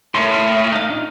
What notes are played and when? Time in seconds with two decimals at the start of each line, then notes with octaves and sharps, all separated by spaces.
0.15 A2 A#4 C#5 C6
0.34 D#6 F6
0.72 D#4 F5
0.89 D4 D#4 F4